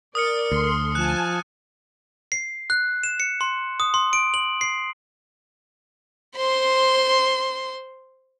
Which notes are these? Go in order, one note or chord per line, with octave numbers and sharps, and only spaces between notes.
A#4 D5 D#6 F6 C#7
D2 A4 C6
F3 G#5 A5 F#6
C7
F#6
E7
C#7
C6
D#6
C6
D7
F#7
C7
C5 C6